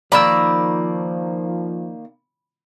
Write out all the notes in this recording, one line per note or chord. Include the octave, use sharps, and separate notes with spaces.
D#3 F3 A#3 D5 B5 E6